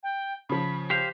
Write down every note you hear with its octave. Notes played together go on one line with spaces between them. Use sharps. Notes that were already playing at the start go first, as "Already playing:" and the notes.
G5
C#3 F3 B5
G4 C5 F5 G6